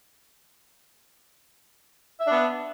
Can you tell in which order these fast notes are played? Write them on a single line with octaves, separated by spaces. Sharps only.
E5 D4 B3